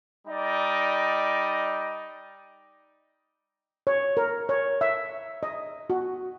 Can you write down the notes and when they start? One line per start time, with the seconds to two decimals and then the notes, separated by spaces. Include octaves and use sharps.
0.27 G3 D#4 D5 D#5
3.87 C#5
4.17 A#4
4.49 C#5
4.81 E5
5.43 D#5
5.90 F#4